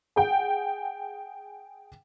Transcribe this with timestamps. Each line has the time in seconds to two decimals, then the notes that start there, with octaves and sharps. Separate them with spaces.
0.16 G#4 F#5 G5